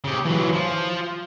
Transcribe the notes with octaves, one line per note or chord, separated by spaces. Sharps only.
C#3 G4
E3 F#3
F3